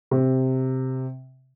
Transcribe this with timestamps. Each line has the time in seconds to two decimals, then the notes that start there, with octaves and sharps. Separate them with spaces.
0.11 C3